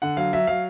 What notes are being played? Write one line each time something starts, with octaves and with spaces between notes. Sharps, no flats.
D3 F#5
F#3 F5
F#3 E5
F#3 F5